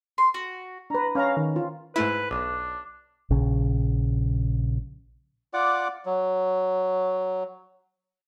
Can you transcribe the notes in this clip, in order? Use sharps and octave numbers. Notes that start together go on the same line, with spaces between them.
C6
F#4
D4 B4 A#5
C#4 C#5 F5 A#5
D#3
F4
G#2 A3 E4 B4
B1 D4
A#1 C#3
F4 D5 F#5 D6
F#3